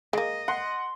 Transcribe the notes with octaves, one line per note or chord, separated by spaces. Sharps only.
G#3 A#3 D#5
F#5 C6